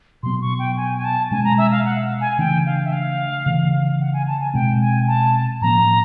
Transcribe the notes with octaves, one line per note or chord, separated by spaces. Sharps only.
B2 F#3 B3 C6
C#6
G5
G#5
G#5
A5
B2 G#3 C#4 G#5
A#5
E5
F5
F#5
G#5
C#3 E3 A3 D4 G5
F5
E5
F5
C#3 E3 A3
F#5
G#5
A5
G#5
B2 G#3 C4 G5
G#5
A5
A2 F3 A#3 C#4 A#5